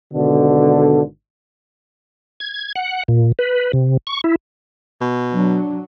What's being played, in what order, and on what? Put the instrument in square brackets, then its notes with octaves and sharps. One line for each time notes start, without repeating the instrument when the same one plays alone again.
[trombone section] G#1 B2 D3
[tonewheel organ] G#6
F#5
A#2
B4
C3
C#6
E4
[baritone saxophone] B2
[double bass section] F#3 [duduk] D4